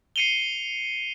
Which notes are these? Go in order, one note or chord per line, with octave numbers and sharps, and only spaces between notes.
C7 C#7 D#7 F7 G7